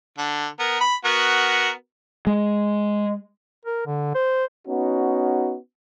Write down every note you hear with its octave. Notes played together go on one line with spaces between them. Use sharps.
D3
B3 A#4
B5
B3 F#4 A#4
G#3
A#4
D3
C5
B3 C#4 D#4 F#4